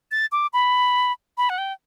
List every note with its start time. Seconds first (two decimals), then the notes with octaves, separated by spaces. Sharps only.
0.11 A6
0.32 D6
0.53 B5
1.37 B5
1.49 F#5
1.58 G5